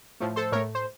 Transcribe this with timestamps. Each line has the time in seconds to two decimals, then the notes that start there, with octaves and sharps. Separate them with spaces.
0.20 A2 F3 A3
0.36 A4 C5
0.52 A2 A3 A#4 C#5
0.75 C5